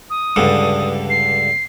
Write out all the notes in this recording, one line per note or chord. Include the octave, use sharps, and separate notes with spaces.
D#6
C#2 G2 D3
C7